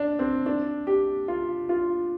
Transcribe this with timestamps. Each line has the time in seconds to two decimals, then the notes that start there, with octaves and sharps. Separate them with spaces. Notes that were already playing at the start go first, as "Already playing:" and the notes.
Already playing: D4
0.19 C4
0.46 D4
0.87 G4
1.28 F4
1.69 F4